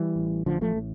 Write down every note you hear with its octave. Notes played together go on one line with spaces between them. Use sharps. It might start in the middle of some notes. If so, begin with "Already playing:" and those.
Already playing: E3 G3
A1
A1 D3 F3
F3 A3
A2